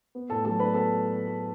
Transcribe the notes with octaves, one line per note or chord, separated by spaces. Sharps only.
B3
A2 A4 A5
F#3 A4 A5
D4 B4 B5
B3 A4 A5